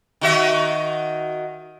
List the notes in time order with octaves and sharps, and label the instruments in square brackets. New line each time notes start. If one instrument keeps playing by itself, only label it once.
[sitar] D#3 F#4 E5